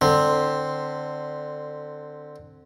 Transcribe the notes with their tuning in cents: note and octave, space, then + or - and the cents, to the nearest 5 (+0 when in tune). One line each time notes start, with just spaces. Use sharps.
D3 +20 C4 +0